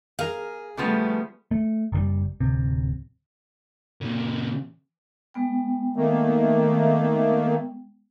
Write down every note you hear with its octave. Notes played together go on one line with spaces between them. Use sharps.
G#4 A#4 F5
C#3 F3 G3 A3 B3
A3
F#1 D3 G3
D1 C3
A#2 C#3
G#3 B3 G5
D#3 A3 A#3